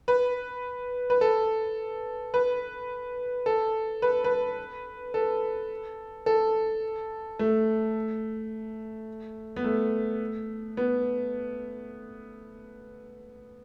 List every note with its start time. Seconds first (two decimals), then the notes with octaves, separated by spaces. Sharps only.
0.08 B4
1.10 B4
1.21 A4
2.34 B4
3.46 A4
4.02 B4
4.24 B4
5.14 A4
6.26 A4
7.39 A3
9.56 B3
9.64 A3
10.77 B3